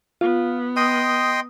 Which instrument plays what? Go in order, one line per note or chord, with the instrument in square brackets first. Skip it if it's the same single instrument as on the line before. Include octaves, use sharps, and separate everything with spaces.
[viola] B3 [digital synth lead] F4
[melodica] D#5 G5 C6 [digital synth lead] D#6